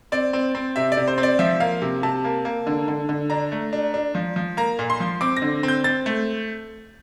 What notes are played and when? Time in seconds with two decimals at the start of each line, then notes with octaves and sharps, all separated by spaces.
0.12 C4 D5
0.33 C4
0.55 C4
0.76 C3 E5
0.92 D5
0.97 C3
1.08 C5
1.18 C4
1.23 D5
1.39 F3 E5
1.60 A#3 F5
1.82 C3
2.03 C3 A5
2.24 A#3
2.45 A#3
2.67 D3
2.88 D3
3.09 D3
3.30 D4 A#5
3.52 A3
3.73 D4
3.94 D4
4.15 F3
4.36 F3
4.57 A#3 A#5
4.79 A#2
4.90 C6
5.00 F3
5.21 C4 D6
5.37 A#6
5.42 D3
5.63 C4
5.68 G6
5.84 C4 A6
6.06 A3